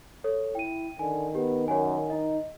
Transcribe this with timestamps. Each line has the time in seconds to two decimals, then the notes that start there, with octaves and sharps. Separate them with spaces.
0.24 A4 C#5
0.55 E4 G5 D#7
0.99 D3 D#3 G#5
1.35 B3 G4
1.68 F#2 C#5 F#5 G#5
2.10 D#4 D#5